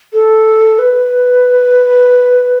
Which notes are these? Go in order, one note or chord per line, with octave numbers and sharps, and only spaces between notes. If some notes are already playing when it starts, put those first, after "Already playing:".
A4
B4